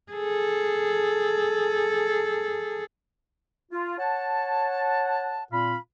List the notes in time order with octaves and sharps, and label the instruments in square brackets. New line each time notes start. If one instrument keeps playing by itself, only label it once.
[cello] G#4 A4
[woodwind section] F4
C#5 F#5 A5
A#2 C4 F4 F5 B5